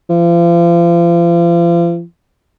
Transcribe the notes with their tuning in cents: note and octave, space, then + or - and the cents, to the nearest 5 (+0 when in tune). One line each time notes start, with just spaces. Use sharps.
F3 -40